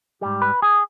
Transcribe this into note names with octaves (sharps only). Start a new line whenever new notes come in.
G#2 G3 G4
B4
G#4